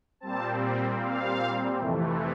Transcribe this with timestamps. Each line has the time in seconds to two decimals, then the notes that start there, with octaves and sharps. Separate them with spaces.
0.20 A#2 G3 C4 A5
1.00 F5
1.79 F2 C3 E3 A3